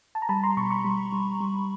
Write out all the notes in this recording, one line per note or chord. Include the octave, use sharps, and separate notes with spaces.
A5
A#5
G3 A5 B5
A#5 C6
B2 B5 C#6
B5 C#6
G3
G3
G3